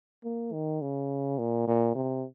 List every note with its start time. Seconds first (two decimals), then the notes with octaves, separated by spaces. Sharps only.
0.25 A#3
0.53 D#3
0.82 C#3
1.38 A#2
1.68 A#2
1.95 C3